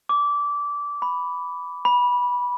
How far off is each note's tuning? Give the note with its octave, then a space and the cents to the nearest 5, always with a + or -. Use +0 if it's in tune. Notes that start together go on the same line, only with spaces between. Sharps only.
D6 -20
B5 +5
B5 -15